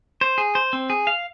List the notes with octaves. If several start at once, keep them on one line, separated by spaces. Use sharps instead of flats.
C5
G#4
C5
C4
G#4
F5